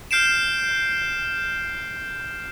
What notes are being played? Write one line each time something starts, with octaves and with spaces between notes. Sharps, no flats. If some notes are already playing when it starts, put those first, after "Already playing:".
F6 G6 C7 D7 E7